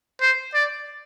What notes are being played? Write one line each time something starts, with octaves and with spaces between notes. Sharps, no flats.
C5
D5